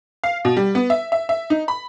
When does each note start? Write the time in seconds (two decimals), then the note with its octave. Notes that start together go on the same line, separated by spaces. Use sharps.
0.24 F5
0.45 B2
0.57 G3
0.75 B3
0.90 E5
1.12 E5
1.29 E5
1.50 D#4
1.68 B5